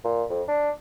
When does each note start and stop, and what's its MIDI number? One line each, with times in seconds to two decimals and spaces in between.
0.04 0.24 46
0.29 0.42 41
0.48 0.70 62